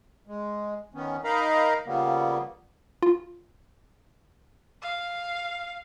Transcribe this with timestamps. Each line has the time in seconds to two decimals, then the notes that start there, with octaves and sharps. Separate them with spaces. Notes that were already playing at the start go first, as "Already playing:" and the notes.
0.27 G#3
0.94 D#3 B3 C#4
1.24 D#4 A#4 D#5 F5 A#5 B5
1.86 C#3 F3 G3 A#3 B3
3.03 F4
4.82 F5